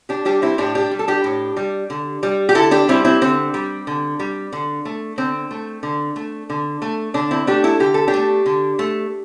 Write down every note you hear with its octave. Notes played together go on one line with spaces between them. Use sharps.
D4 G4
G3 D4 G4
C4 E4
A2 D4 G4
D4 G4
G3
A4
D4 G4
A2
G3
D3
G3
G4
D3 E4 A4
D4 G4
G3 C4 E4
C4 E4
D3 C4
G3
D3
G3
D3
A3
D3 C4
A3
D3
A3
D3
A3
D3 D4
C4 E4
A3 D4 G4
E4 A4
D3 G4
A4
D4 G4
A3
D3
A3